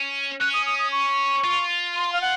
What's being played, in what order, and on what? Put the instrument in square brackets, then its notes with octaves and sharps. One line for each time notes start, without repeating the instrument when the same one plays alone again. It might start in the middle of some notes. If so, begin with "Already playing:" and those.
Already playing: [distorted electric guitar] C#4
[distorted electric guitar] C#4 [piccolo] F#6
[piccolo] D#6
D#6
D#6
C#6
[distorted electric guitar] F4
[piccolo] C6
F5
F#5